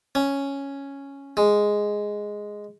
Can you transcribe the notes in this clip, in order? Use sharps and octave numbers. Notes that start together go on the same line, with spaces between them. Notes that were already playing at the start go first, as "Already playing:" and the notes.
C#4
G#3